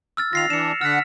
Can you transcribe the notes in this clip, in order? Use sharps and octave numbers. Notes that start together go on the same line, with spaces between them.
E6 F6 A6
D#3 F4 A#6 C7 F7
E3 D4 C#7 E7
D3 F#5 F6 B6